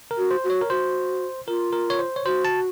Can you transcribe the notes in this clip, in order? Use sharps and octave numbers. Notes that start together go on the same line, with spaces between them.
A#4
F#4
C5
F#4
C#5
A#4
F#4 C5
F4 A#4
A#4
C#5
C5
C#5
F#4 C5
A5